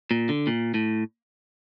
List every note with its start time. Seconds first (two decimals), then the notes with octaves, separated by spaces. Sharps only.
0.11 A#2
0.29 D3
0.47 A#2
0.74 A2